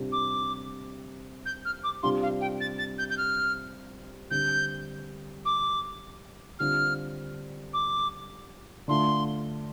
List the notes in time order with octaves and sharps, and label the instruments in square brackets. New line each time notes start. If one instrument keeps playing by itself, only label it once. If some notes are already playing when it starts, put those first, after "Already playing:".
Already playing: [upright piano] C3 G3 D4 F4
[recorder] D6
G6
F6
D6
[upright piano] C3 G3 D4 F4 [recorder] C6
[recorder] F5
G5
A6
A6
G6
G6
F6
[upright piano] D3 G3 C4 [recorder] G6
[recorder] D6
[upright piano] D3 G3 C4 F4 [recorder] F6
[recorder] D6
[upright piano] D3 A3 F4 [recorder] C6